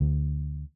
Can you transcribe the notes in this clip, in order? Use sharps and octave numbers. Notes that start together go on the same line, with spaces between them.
D2